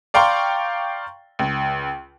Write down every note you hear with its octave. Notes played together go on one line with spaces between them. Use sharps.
D5 F5 G5 A#5 C6 C#6
C#2